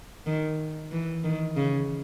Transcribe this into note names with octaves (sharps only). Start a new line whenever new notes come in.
D#3
E3
D#3
C#3